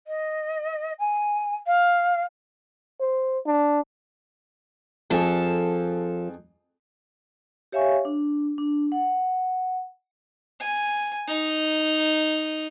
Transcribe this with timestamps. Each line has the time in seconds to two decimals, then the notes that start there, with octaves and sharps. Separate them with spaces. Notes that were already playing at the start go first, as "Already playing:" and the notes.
0.07 D#5
0.98 G#5
1.66 F5
3.00 C5
3.46 D4
5.10 F2 F3 G#4 A4
7.72 G4 C#5 E5 F5 G#5 C#6
8.05 D4
8.58 D4
8.92 F#5
10.60 G#5
11.28 D#4